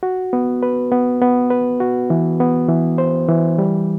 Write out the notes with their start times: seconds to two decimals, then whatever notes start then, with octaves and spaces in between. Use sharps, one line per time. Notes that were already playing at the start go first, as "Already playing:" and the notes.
0.03 F#4
0.33 B3
0.63 B4
0.91 B3
1.21 B3
1.50 B4
1.80 F#4
2.10 E3
2.40 B3
2.69 E3
2.98 C5
3.29 E3
3.58 G3